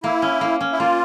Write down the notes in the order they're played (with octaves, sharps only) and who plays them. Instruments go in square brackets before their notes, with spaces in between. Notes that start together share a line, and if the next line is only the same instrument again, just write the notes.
[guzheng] A#3 [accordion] E4
[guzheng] C#4
A#3
C#4
[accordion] E4
[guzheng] A#3 [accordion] F4